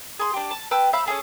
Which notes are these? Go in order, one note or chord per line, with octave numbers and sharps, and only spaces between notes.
G#4 C6
D4 G4
A5
B4 G5 A5 E6
C5 E5 F5 B5
C#4 D#4 G#4 A4